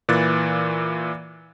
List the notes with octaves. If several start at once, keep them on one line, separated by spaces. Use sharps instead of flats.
A#2 E3 F#6 A6